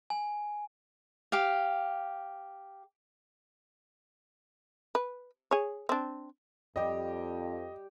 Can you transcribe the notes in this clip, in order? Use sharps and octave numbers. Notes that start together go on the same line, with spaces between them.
G#5
G4 F5
B4
G#4 C#5
C4 D4
F2 G3 G4 D#5